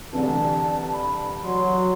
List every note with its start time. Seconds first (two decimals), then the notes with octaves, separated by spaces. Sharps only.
0.13 C2 D3 E3 A5
0.92 B5
1.43 F#3 C6